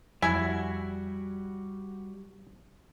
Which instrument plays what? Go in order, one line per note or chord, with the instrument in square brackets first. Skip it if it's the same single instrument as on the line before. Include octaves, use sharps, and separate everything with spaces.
[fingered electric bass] F2 [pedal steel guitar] G3 F#4 F#5 [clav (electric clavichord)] E4 [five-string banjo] G#5